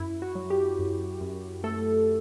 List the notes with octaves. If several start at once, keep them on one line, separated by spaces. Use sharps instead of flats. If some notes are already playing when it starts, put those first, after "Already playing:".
Already playing: F#2 E4
F#4
F#3
G4
F#2
F#2
A3 A4